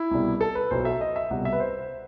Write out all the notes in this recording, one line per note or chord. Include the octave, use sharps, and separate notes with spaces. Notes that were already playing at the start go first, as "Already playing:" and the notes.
Already playing: E4
C2 B2 G3
A4
B4
B1 B2 F#3 C5
E5
D#5
E5
C2 B2 G3 F#5
E5
B4
C5